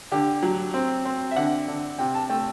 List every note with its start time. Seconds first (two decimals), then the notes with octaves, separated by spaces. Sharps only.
0.12 D3 G4
0.43 F#3
0.74 C4
1.05 C4
1.31 E5
1.36 D3 F#5
1.68 D3
1.99 C3 G5
2.15 A5
2.30 A3 G5